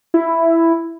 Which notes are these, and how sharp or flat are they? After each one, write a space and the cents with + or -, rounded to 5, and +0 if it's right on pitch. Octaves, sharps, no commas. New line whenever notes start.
E4 +5